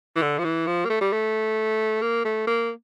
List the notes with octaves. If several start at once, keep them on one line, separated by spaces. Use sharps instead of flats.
E3
D3
F3
E3
F3
A#3
A3
G3
A3
A#3
A3
A#3